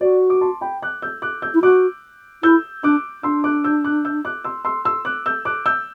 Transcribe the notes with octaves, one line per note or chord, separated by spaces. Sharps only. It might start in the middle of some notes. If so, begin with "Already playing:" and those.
F#4 D5
D6
A5 C6
G5 B5
D6 F#6
E6 G6
D6 F#6
E6 G6
E4
F#4 D6 F#6
E4 E6 G6
D4 D6 F#6
D4 C6 E6
D6 F#6
E6 G6
D6 F#6
E6 G6
D6 F#6
C6 E6
C6 E6
C6 E6
D6 F#6
E6 G6
D6 F#6
E6 G6